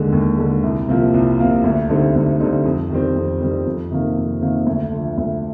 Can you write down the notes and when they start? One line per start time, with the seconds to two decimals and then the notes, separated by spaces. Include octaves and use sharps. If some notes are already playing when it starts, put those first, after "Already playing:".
Already playing: D#2 D3 G#3
0.12 D#2
0.38 D3 G#3
0.63 C2
0.88 C3 F3 A#3 F4
1.14 C2
1.39 C3 F3 A#3 F4
1.64 D2
1.89 D3 G3 C4 D#4
2.15 D2
2.40 D3 G3 C4 D#4
2.65 F2
2.90 D#3 G3 C4
3.16 F2
3.41 D#3 G3 C4
3.65 F2
3.91 C3 D#3 A#3
4.17 F2
4.41 C3 D#3 A#3
4.66 D2
4.92 D3 F3
5.17 D2